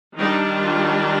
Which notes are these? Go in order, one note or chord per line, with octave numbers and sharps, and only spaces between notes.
D#3 G3 D4 D#4
F4